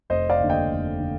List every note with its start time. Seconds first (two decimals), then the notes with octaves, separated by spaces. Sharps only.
0.10 F1 C5 D#5
0.30 D5 F5
0.40 D#2 D3
0.50 D#5 G5
0.70 F1
1.00 D3